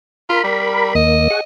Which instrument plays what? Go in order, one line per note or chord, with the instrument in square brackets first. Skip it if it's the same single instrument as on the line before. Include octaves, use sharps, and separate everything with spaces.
[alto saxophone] F4 [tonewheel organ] A#4 B5
[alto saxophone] G3
[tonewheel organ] D#2 A#3 [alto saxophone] D#5
[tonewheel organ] G#4 F#5 C#6